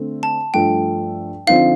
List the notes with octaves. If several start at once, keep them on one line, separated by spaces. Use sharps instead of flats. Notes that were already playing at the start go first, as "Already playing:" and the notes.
Already playing: D3 A3 C4
A5
G2 F3 A3 G5
D3 F3 C4 D#4 F5